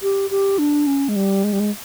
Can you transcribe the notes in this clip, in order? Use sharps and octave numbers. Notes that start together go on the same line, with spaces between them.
G4
G4
D4
C#4
G#3
G3
G#3
G3
G#3